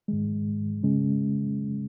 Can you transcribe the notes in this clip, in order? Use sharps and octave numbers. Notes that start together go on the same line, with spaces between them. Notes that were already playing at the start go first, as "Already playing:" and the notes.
G#2 D#3 G#3
C#3 G#3 C#4